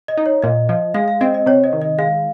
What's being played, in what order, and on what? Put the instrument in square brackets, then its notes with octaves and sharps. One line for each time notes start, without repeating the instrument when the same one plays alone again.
[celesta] D#5
[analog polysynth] D#4
[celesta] C#5
[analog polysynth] A#2 [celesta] D#5
[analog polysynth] F3 [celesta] D#5
[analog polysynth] G#3 [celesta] F5
[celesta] F5
[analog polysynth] C4 [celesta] D#5
[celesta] D#5
[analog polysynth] C3 [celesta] C#5
[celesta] D#5
[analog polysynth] D#3
[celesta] D#5
[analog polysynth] G#3 [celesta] F5